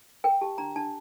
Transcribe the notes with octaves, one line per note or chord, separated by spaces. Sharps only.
A#4 G5
G4 A5
D4 A#5
D4 A5